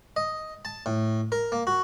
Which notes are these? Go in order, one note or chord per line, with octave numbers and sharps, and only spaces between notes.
D#5
A5
A2
A#4
A#3
F#4